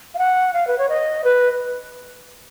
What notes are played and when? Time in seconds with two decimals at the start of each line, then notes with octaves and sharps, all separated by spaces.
0.14 F5
0.18 F#5
0.53 F5
0.67 B4
0.78 C#5
0.89 D#5
1.24 B4